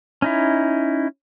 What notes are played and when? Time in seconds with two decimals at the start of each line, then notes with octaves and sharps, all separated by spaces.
0.22 C#4 D#4 E4